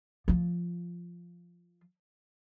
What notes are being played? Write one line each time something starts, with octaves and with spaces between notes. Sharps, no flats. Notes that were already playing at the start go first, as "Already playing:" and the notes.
F3 F4